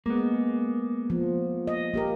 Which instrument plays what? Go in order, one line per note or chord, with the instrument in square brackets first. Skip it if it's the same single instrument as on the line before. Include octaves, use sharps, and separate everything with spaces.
[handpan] G#3 [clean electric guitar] A#3 B3
[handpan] F3
D#5
A#3 G4 A#4